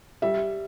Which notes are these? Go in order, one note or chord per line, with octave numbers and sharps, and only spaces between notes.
G3 E5